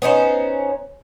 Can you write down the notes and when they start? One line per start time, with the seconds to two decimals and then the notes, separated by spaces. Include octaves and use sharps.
0.02 B3 C#4 D#4 C5